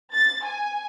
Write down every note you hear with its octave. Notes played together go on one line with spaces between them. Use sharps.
A6
G#5